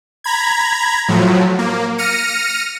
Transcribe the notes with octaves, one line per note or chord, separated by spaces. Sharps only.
A#5 B5 G#6
A2 F3 F#3
A#3
F6 A#6 C#7 D#7